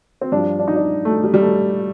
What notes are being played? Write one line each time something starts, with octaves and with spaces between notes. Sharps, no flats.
C4
G2 F3 D4
D4
D#4
D4
A3
G3
G3
A3